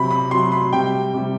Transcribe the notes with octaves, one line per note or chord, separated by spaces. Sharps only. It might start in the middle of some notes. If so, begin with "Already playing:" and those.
Already playing: C3 F#3 B5
B5
C3 F#3 C6
B5
C3 G3 G5
C3 G3